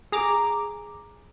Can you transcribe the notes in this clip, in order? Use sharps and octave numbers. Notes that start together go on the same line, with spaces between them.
G#4 A#5 D6